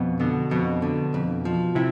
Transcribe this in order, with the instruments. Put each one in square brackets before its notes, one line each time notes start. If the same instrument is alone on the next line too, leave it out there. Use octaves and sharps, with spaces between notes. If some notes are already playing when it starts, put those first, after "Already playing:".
Already playing: [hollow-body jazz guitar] F2 [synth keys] B2
[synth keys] B2 [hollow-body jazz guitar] D3
[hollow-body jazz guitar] F2 [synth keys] B2
[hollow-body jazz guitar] D3
F2
F3
[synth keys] C3 [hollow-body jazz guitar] E4